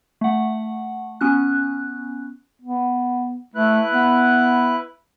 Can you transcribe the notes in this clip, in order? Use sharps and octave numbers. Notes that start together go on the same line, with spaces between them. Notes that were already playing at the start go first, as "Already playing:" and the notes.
A3 F#5
B3 C#4 F#6
B3
A3 E4 B4 F#6
B3